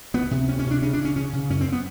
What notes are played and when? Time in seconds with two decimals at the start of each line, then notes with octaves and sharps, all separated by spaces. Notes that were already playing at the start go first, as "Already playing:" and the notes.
0.14 D2 B3
0.31 C3
0.48 D2 C#4
0.59 C#4
0.66 C3
0.71 D4
0.82 C#3 C#4
0.93 D4
0.99 C#3
1.05 C#4
1.16 C#3 C#4
1.33 C#3
1.50 F#2 C#4
1.61 C4
1.72 B3